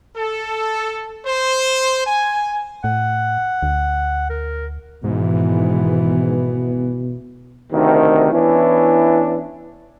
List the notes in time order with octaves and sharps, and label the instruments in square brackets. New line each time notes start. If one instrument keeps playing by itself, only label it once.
[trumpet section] A4
C5
G#5
[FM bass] A2 [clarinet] F#5
[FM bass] D2
[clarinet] A#4
[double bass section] G#1 E3 B3 [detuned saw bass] G#2 [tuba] B2
[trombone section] D2 C3 D#3
E3 B3 C#4 D4 E4